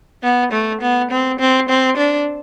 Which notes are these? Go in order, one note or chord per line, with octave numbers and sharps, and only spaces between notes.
B3
A3
B3
C4
C4
C4
D4